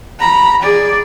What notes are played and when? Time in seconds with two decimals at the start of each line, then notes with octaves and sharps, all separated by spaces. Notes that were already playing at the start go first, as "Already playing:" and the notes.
0.20 A#5 B5
0.62 G#4 D5